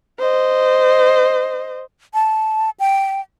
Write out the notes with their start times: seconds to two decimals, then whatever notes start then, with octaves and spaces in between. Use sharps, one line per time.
0.19 C5 D#5
2.14 A5
2.80 G5